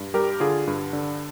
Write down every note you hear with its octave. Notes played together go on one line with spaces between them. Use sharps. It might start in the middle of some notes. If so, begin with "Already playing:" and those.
Already playing: G2
G3 G4 A#4
D3 F4 G#4
G2
D3